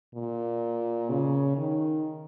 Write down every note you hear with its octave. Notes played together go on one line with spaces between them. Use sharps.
A#2
C#3
D#3